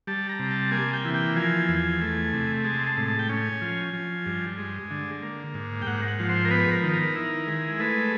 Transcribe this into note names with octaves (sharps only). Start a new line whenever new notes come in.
G3 A5
A#5
C3
A5
A#3 G#5
G5
E3
G5
F3 G#5
E2
A3
C3
G#3 A5
A5
A2
A5
G5
C#4 G#5
F3
F3
G2
G#3
D3
A#3
G#2
G5
G#2 F#5
F#5
F3
C5
A#4
B3 B4
A#4
D#3
A#4
E4
G#3
A3 B4